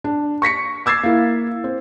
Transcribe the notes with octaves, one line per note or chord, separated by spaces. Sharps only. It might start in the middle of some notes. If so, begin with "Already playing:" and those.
D4
C#6 A#6 B6 C#7
D6 E6 G#6 A6 C7
A#3 E4
C4